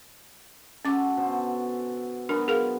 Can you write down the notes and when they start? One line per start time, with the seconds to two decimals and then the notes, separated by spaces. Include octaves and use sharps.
0.85 G#3 C#4 F#4 A4 D6
1.17 B2 D3 C5
2.29 F#3 G#3 B3 D4 A#4
2.48 G#4 A#4 F5